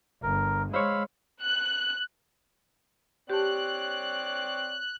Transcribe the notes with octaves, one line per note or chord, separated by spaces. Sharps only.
G1 A#4
G#3 C5 C#5 F5 B5 E6
F#6
C4 G4 C#5 D5 A5 F#6